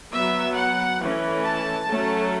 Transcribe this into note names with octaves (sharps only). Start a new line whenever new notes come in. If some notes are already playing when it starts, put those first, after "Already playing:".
F#3 B3 E5
F#5
E3 A3 C#4
A5
F#3 A3 C#4